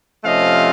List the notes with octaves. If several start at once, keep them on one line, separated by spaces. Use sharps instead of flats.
C3 F3 A3 C#4 D#5 F5